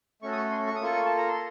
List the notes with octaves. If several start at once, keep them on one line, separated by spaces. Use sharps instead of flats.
A3 C#4 F#4 A4 C#6
D#6
C#6
C6
C#6
D#6
A#3 F4 A4 C#6
A5
A#5
C6